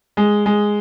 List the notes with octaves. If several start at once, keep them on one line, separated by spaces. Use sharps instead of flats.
G#3
G#3